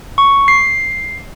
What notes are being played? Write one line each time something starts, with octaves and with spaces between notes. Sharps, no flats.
C#6
C7